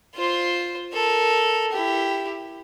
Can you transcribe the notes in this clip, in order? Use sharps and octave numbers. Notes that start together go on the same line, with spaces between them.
F4 C5
A4 A#4
E4 G4